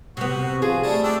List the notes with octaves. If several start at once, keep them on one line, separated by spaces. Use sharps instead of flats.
C3 B3 F#4
F3 G#4
G3 A3 A5
D4 G4 E6